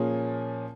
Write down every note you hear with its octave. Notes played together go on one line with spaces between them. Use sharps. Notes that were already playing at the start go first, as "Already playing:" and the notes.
Already playing: A#2 F3 A#3 C#4 G#4